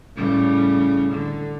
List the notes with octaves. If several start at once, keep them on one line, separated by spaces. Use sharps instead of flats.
A2 C#3 G3
D3